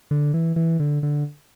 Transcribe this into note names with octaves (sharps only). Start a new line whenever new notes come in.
D3
E3
E3
D3
D3